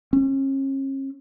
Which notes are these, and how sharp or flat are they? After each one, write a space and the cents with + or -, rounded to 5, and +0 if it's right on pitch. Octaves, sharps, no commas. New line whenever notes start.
C#4 -40